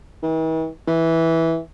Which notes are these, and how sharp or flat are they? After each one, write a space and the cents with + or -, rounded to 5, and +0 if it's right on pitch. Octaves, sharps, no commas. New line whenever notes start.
E3 -45
E3 -10